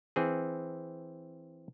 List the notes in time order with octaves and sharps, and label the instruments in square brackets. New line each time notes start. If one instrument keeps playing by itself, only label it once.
[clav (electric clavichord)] E3 C4 G#4